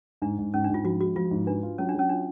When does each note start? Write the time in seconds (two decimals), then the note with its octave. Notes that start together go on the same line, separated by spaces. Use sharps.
0.22 G#2 D4
0.38 G#2
0.54 G#2 C#4
0.64 D4
0.70 G#2 F4
0.84 F3 F#4
1.00 G#3 F#4
1.16 F3 F4
1.31 G#2
1.47 D4 B4
1.63 F4
1.78 F#3 C#4
1.89 D4
1.95 F#3 C#4
2.09 D4 F4